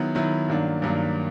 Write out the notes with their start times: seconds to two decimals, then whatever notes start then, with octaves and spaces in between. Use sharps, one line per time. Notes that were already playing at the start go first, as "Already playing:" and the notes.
Already playing: D#3 F#3 B3 E4
0.15 D#3 F#3 B3 E4
0.48 G2 D#3 F#3 A#3 D4
0.82 G2 D#3 F#3 A#3 D4